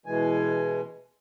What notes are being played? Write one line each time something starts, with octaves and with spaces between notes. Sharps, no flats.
B2 E3 G#3 G#5